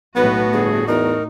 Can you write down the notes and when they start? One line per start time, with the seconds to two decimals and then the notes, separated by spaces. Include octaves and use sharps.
0.16 B1 A2 B3 F#4 B4
0.53 G1 G#4
0.88 E2 D#4 A#4